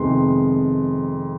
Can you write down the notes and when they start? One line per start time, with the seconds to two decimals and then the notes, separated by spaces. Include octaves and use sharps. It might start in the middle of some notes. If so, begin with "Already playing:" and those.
Already playing: F2 C3 D#3 G#3 B3 C6